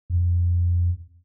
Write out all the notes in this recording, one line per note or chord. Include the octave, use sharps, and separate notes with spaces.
F2